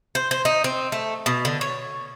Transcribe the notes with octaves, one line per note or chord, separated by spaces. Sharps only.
C5
C5
D#4
C4
A3
B2
D3
C#5